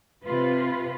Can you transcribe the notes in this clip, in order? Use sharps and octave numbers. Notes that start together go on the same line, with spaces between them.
C3 F4 B4